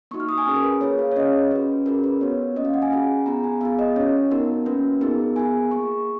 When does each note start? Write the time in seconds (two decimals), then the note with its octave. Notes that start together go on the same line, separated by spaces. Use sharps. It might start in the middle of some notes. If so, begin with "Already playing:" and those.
0.11 A#3 D#4 F#4 C#6
0.20 F6
0.29 D#6
0.38 G#5
0.47 C#4 G#4
0.56 A#4
0.63 B4
0.81 A#3 F4 G#4 C#5
0.99 F5
1.12 C#5
1.16 C#4 G#4 D#5
1.51 C#4 F#4 B4
1.86 C#4 F4 G#4 A#4
2.04 B4
2.21 B3 F#4 C#5
2.56 A#3 C#4 F#4 D#5
2.65 F5
2.74 F#5
2.82 G#5
2.91 C#4 F4 G#4
3.26 B3 F4 G#4 A#5
3.44 G#5
3.61 B3 F4 G#4 F5
3.79 D#5
3.96 C#4 F#4 C#5
4.31 B3 D#4 F#4 A#4
4.66 A#3 C#4 F#4 B4
5.01 B3 D#4 G#4 A#4
5.36 B3 F4 G#4 G#5
5.71 A#3 F4 G#4 C#6